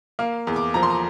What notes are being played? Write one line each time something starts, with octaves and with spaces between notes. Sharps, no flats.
A#3 F5
E2
D6
F3 A#5
C6
A#5